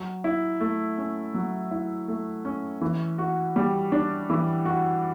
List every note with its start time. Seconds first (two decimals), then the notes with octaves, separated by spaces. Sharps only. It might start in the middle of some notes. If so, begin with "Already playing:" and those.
Already playing: F#3
0.24 E4
0.60 A3
0.98 C#4
1.34 F#3
1.71 E4
2.08 A3
2.45 C#4
2.81 E3
3.18 F#4
3.56 G3
3.92 D4
4.30 E3
4.65 F#4